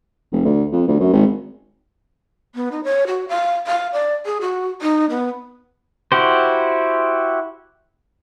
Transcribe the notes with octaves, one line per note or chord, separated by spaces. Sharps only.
F1
D2
F2
D2
F#2
G#1
B3
D#4
C#5
F#4
F5
F5
D5
G#4
F#4
D#4
B3
E4 F#4 G4 C5